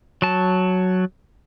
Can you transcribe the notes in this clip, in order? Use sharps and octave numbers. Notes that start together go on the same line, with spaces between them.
F#3 A5